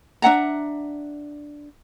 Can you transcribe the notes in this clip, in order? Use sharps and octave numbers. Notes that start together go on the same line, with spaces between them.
D4 E5 F#5 A#5